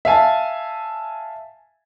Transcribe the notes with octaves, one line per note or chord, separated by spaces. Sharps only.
E5 F5 G#5 A5